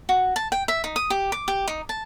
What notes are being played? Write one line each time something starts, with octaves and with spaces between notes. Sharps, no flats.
F#4
A5
G5
E5
D#4
D#6
G4
D6
G4
D#4
A5